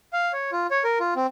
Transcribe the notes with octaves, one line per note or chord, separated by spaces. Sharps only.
F5
C#5
F4
C#5
A#4
F4
C4